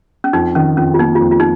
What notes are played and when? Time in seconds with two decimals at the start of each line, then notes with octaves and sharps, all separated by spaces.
0.24 C#4
0.33 F2 D#4
0.55 D#3 C#4
0.77 F2 C#4
0.94 F4
0.99 A#3 D#4
1.15 F4
1.21 F2
1.31 F4
1.40 D#4